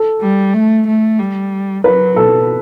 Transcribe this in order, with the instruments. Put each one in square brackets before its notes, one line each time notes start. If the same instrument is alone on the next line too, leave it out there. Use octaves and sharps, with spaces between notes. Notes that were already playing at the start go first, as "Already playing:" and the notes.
Already playing: [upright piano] A4
[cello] G3
A3
A3
G3
[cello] F#3 [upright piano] B4
[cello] B2 [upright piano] A4